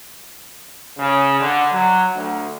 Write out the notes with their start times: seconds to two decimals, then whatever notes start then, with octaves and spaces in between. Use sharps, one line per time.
0.98 C#3
1.40 D3
1.72 F#3
2.16 D2